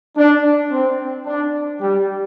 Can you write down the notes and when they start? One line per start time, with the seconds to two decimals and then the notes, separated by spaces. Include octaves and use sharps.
0.17 D4
0.71 C4
1.27 D4
1.81 G3